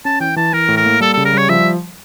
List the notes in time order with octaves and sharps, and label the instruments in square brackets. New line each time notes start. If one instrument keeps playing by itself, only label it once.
[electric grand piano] C#4 [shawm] A5
[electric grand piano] E3 [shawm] G5
[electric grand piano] E3 [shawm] A5
[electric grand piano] E3 [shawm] A#4
[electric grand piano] A2
[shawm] A#4
[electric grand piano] A#3
[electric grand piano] G3 [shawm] A4
[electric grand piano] C#3 [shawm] A4
[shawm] A#4
[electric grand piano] G3 [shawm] C#5
[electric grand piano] F3 [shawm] E5